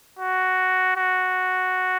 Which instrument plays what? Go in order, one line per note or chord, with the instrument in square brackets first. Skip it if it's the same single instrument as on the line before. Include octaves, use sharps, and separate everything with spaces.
[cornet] F#4
F#4